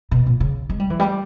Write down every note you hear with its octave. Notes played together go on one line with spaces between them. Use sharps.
B2
A#2
C#3
G#3
G3
E3
G3